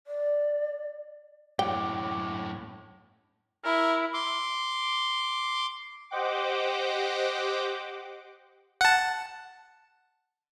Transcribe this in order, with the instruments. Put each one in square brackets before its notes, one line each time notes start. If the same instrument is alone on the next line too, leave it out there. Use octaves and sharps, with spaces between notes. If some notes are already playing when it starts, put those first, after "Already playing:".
[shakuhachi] D5
[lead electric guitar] F#2 A2 [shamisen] G5 [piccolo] D6
[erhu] E4 [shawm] A#4
[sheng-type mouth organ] C6 D6
[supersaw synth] G4 C5 D#5 F#5 G5 D6
[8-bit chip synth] F#5 A5